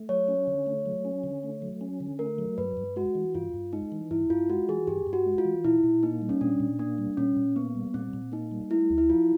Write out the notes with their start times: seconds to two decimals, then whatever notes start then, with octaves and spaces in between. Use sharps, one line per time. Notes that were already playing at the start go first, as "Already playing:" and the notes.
Already playing: A3
0.09 F#3 C#5
0.28 C#4
0.47 D3
0.66 A3
0.86 F#3
1.05 C#4
1.24 D3
1.43 A3
1.62 F#3
1.81 C#4
2.00 D3
2.19 A3 A#4
2.39 F#3
2.58 G2 B4
2.77 G2
2.96 G#3 F#4
3.15 E3
3.35 G2 F4
3.54 G2
3.73 G#3 D#4
3.92 E3
4.11 G2 E4
4.30 G2 F4
4.50 G#3 F#4
4.69 E3 G#4
4.87 G2 G4
5.07 G2
5.13 F#4
5.26 G#3
5.38 F4
5.45 E3
5.64 A#2 E4
5.84 A#2
6.03 A#3 D#4
6.22 G3
6.29 C#4
6.41 A#2 D4
6.60 A#2
6.79 A#3 D4
6.98 G3
7.17 A#2 C#4
7.37 A#2
7.56 A#3 B3
7.75 G3
7.94 A#2 C4
8.14 A#2
8.32 A#3 D#4
8.51 G3
8.70 A3 E4
8.90 D2
8.98 E4
9.10 F3 F4